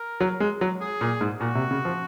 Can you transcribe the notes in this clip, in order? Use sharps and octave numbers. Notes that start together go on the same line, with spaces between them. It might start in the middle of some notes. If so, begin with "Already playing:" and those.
Already playing: A#4
F#3
G#3
F#3
G#4
A#2
G#2
A#2 F#4
C3
C#3
F3